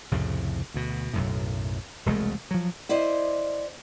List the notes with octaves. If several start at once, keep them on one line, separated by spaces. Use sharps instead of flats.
C2 F2 A2 C#3
D2 B2
B1 F#2 A2
E1 C2 G#3 A3
F3 F#3
E4 C5 D5 D#5